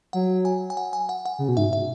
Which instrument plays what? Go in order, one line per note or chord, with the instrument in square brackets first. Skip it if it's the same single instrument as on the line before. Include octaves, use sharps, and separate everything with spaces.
[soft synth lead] F#3 [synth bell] F#5
[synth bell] G#5
G#5
F#5
G#5
F#5
F#5
[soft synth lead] C#3
B2
[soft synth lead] G#2 [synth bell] E5
[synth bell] E5